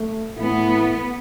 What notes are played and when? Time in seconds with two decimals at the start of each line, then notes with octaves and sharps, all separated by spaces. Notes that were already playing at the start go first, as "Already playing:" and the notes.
Already playing: A3
0.37 A2 E3 A3 B3 E4